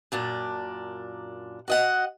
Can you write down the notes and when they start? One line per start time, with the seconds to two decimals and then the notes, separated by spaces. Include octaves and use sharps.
0.12 F#2 A#2 D4
1.68 F#4 D#5 F#5